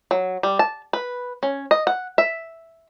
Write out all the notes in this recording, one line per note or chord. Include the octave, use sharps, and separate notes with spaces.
F#3
G3
A5
B4
C#4
D#5
F#5
E5